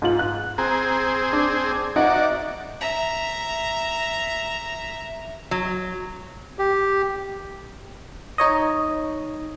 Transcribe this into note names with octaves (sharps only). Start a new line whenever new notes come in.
G#2 F4 F#7
F#6
C4 G#4 A#5
D4
D#4 F#4 D5 E5 F#5
E5 A#5
F#3
G4
D#4 C#5 D#5